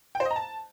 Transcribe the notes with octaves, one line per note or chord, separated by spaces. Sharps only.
G5
C5
D#5
A#5
A5